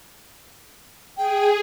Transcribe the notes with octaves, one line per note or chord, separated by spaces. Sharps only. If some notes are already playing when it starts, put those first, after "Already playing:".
G#4 G5